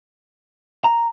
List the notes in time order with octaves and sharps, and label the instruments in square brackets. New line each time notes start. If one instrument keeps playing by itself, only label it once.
[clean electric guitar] A#5